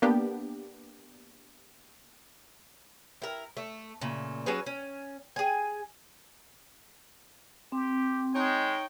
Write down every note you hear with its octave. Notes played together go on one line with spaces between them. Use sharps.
A#3 B3 D4 G4
E4 A#4
A3
A#2 C#3 A3
F#3 C#4 G#4 B4
C#4
G#4 G#5
C4 G4
G#3 D#4 C#5 G5